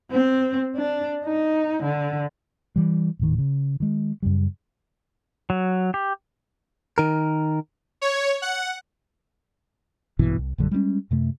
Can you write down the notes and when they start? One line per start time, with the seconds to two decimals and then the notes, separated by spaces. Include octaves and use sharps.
0.11 C4
0.76 D4
1.25 D#4
1.83 D3
2.76 E3 G3
3.19 D#1 A2 D#3
3.39 C#3
3.80 D#3 G#3
4.23 F#2 C#3 G3
5.50 F#3
5.94 G4
6.98 D#3 A#4
8.01 C#5
8.42 F#5
10.19 A#1 G2 B2 E3
10.38 C2
10.58 A#1 F#2 D3 G3
10.71 G3 G#3 B3 C#4
11.11 F#2 C3 A3